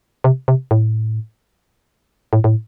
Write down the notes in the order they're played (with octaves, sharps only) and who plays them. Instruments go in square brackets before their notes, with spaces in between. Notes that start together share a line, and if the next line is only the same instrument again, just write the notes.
[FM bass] C3
C3
A2
A2
A2